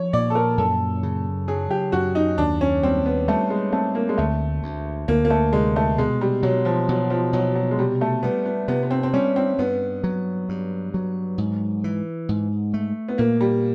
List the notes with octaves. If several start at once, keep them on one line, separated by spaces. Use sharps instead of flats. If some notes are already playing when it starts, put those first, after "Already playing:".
Already playing: F3 C#5
A#2 D5
A4
A#4
F#2 A4
C#3
F#3 G#4
G4
F#2 F#4
D#4
D#2 D4
C#4
G3 C4
B3
G3 A3
G#3
A3 C4
A#3
G#3
D2 A3
D2
D2 A#3
A#3
A3
C3 G#3
A3
B2 G#3
G3
B2 F#3
F3
B2 F#3
F3
B2 F#3
F#3
G#3
C3 G3
A3
G3 B3
B3
C3 B3
B3
C4
C4
G3 C#4
C4
G2 B3
F#3
G2
F#3
G#2
E3
G#2
A3
B3
A#2 A#3
G3